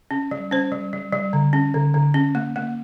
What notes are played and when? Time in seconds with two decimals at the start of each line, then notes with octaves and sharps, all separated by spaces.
0.11 C#4
0.31 G3
0.51 C#4 C5
0.72 G3
0.93 G3
1.12 G3
1.33 D3
1.53 C#4
1.74 D3
1.94 D3
2.14 C#4
2.35 A#3
2.56 A#3